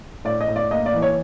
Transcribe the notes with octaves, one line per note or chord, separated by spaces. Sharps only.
A2 D5
D#5
A2
D5
A#3 D#5
D5
E3
C#5